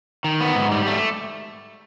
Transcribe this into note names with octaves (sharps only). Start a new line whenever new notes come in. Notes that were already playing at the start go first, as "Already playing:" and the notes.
D#3
B3
G#2
G3
A3